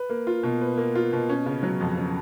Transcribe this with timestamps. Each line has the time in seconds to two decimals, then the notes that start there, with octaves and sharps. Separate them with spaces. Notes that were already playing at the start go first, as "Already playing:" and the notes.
Already playing: B4
0.09 A#3
0.27 F4
0.43 B2
0.61 B4
0.77 A#3
0.95 F4
1.13 B2
1.29 C#4
1.46 C#3
1.63 F#3
1.81 F2
1.98 C#4